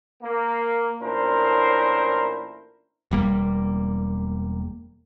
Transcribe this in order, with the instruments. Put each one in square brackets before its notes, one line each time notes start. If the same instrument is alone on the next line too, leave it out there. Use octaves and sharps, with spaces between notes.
[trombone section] A#3
A1 A#2 D4 E4 A#4 C5
[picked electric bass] E1 G3 A#3